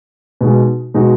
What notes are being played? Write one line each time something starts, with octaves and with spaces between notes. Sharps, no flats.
B2 G#3 D#4 F#4
B2 G#3 D#4 F#4